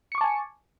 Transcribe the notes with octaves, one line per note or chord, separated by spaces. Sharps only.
G#5 A5 C#6 D6 C#7